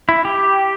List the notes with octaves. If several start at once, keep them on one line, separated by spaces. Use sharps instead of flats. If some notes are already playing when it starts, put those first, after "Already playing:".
E4
G4